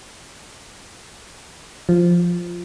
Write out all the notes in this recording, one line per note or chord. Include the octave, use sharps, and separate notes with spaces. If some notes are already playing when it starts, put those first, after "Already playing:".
F3